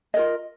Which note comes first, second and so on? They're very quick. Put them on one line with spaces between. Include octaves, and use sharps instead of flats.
D#5 A#4 F4